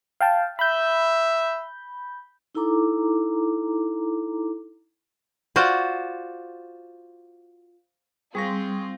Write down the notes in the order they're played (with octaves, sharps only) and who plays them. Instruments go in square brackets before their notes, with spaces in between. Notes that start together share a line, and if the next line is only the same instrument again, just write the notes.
[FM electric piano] F5 G5 A5
[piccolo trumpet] E5 [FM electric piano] B5 G6
[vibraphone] D#4 E4 A4 A#5 D6
[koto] F4 F#4 C5 D5
[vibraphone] G3 [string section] C4 F4 [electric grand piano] G#4 C#6 A#6